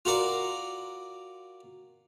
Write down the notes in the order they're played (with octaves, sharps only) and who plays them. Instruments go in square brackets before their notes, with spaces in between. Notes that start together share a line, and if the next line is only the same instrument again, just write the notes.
[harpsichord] F4 F#4 A#4 D5